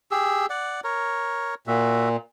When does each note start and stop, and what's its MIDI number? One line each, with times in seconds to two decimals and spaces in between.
0.11 0.46 67
0.11 0.46 68
0.11 0.46 88
0.50 0.80 74
0.50 0.80 78
0.84 1.55 70
0.84 1.55 73
1.67 2.17 46
1.67 2.09 66
1.67 2.09 76